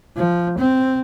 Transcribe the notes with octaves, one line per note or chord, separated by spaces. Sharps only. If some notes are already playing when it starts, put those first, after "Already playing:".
F3
C4